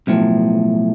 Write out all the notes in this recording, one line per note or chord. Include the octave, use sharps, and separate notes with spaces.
B1 A2 F3